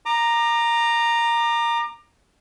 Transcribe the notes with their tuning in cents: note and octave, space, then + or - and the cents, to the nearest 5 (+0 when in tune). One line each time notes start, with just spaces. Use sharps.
A#5 +0 D6 +35